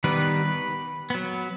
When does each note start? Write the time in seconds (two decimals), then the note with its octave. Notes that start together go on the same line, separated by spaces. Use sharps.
0.04 D#3 G3 B3 B4
1.10 F#3 B3